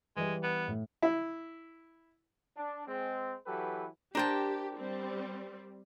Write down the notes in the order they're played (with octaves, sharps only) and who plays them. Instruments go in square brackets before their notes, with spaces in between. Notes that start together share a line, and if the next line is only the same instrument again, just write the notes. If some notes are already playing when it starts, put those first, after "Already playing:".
[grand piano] E3 G3 [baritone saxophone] G#3
[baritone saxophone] B3
[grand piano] A2
[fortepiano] E4
[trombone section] D4
G#3 C4
E3 F#3 G4 A4 B4
[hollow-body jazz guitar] D4 C5 [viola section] G4 [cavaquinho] A#4 G5 A5
[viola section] G3 C4